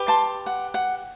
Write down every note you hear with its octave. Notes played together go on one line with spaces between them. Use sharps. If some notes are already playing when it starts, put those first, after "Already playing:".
Already playing: G4 B4
A5 C6
F#5
F#5